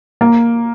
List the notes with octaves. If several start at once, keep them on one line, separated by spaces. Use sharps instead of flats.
A#3